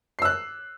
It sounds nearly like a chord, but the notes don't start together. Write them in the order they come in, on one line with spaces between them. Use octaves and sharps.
C7 E6 F#6